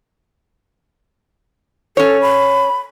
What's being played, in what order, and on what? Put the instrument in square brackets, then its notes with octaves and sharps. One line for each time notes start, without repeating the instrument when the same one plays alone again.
[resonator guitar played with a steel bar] C#4 C#5 [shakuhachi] A4
[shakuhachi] B5